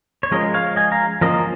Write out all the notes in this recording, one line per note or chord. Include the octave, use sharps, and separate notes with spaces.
C#5
F3 G#3 C#4 A#4 D#5
C#5 F5
D#5 G#5
F5 A#5
F3 A#3 C#4 A#4 D#5